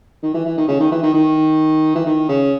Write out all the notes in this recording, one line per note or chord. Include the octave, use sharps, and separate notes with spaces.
D#3
E3
E3
D#3
C#3
D#3
E3
D#3
D#3
E3
D#3
C#3